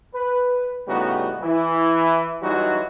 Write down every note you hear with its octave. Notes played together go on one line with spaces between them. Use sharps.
B4
A2 C#3 G3 B3 D#4 F#4
E3 E4
E3 F#3 G3 D#4 F4 F#4